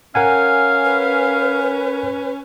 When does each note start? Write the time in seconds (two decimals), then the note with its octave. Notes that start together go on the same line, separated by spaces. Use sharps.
0.15 C#4 A#4 F5 F#5 G#5
0.85 B4